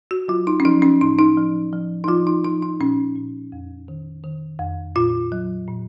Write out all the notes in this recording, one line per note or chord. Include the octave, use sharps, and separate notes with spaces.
F#4
F#3 F4
D#4
C#4
F3 D#4
C#4
A2 D#4
D#4
F3
F3
D#4
F3 F4
D#4
F3 D#4
D#4
A#2 C#4
A#2
F2
D#3
D#3
F2
A#2 F4
F#3
A#2